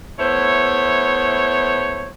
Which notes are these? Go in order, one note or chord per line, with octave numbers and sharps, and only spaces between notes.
A3 B3 E4 C5 C#5